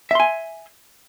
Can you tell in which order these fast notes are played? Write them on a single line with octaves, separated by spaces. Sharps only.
E5 C6 G#5